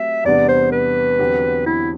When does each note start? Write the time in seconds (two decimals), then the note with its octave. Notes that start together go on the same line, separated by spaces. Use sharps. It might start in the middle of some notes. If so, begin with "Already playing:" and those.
Already playing: F#3 A3 C4 G4 E5
0.24 E2 C3 G3 B3 D4 D5
0.49 C5
0.72 B4
1.19 E2 D3 F#3 C4 G4
1.66 E4